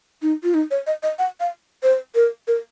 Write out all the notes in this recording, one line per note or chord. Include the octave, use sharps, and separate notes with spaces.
D#4
F4
D#4
C#5
D#5
D#5
F#5
F5
C5
A#4
A#4